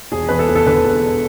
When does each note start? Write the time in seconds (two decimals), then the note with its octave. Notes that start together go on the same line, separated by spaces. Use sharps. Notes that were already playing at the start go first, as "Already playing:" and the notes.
0.12 E1 G#4
0.29 E2 B4
0.39 A4
0.49 E1
0.55 A4
0.66 D3 B4
0.85 E1